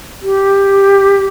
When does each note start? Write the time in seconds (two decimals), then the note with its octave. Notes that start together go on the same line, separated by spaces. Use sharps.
0.23 G4